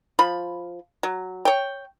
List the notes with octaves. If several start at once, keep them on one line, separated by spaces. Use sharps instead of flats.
F3 B5
F#3
C#5 G5